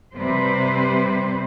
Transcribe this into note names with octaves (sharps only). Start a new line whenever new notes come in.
C3 G3 C4 B4 C5